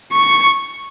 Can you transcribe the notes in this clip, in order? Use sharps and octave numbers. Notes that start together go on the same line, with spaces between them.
C#6